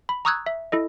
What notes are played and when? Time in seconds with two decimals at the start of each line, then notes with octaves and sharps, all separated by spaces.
0.09 B5
0.25 A#5 C#6 D#6 E6 F#6 G#6
0.46 E5
0.72 E4 A4 D#5